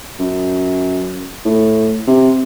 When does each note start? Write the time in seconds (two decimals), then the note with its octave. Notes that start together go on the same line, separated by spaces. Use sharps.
0.19 F#2
1.45 A2
2.07 C3